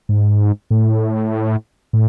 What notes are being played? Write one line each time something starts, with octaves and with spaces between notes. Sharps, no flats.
G#2
A2
A2